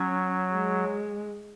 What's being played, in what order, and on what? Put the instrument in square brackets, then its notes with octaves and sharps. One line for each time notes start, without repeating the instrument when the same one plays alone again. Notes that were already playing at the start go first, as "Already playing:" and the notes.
Already playing: [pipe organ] F#3 [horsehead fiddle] C#4
[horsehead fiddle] G#3